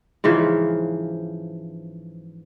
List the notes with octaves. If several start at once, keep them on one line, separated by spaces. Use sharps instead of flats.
G#2 C#3 E3 F3